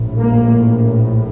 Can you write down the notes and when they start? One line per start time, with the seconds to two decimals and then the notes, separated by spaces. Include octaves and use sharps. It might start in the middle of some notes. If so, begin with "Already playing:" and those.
Already playing: A#1 A2
0.17 A#3